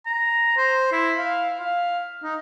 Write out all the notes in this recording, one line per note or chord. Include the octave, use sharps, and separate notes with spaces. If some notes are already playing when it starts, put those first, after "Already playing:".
A#5
C5
E4
F5
F5
D#4